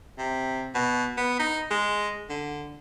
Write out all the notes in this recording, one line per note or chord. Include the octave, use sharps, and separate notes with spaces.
C3
B2
B3
D#4
G#3
D3